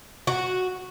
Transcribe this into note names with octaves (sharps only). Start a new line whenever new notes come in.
F#4